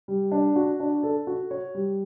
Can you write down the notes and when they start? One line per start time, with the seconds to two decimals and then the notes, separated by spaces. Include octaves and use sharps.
0.08 G3
0.32 D4
0.56 F#4
0.80 D4
1.03 A4
1.27 F#4
1.51 C#5
1.75 G3